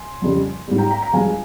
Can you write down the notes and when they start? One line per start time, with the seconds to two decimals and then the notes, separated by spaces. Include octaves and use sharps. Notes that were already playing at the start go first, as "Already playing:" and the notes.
Already playing: G#5 C6
0.22 F2 C#3 G3
0.68 G#2 G3
0.78 G5 A#5
0.90 G5 A#5
1.01 G5 A#5
1.13 G2 F3 G#3 F5 G#5